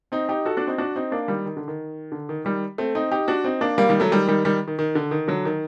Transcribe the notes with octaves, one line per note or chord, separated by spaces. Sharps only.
C4 D#4
D#4 G4
F#4 A4
D4 F#4
C4 D#4
D4 F#4
C4 D#4
A#3 D4
D#3 G3
D#3
D3
D#3
D3
D#3
D#3 G3
A3 C4
C4 D#4
D#4 G4
D4 F#4
C4 D#4
A#3 D4
G3 A#3
D#3 G3
F#3 A3
D#3 G3
D#3 G3
D#3 G3
D#3
D#3
D3
D#3
D3 F#3
D#3